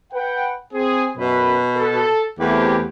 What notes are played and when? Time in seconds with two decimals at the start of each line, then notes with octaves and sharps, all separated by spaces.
0.13 B4 F#5 G5
0.73 C4 G#4
1.17 F#2 B2 B4
1.77 A4
2.39 E2 A3 C4 G4